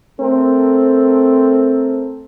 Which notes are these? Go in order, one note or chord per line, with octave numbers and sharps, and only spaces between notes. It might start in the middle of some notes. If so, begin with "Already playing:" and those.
A3 C4 A4 A#4